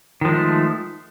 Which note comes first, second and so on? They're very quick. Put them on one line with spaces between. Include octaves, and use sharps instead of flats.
D#3 F3 G#3 A3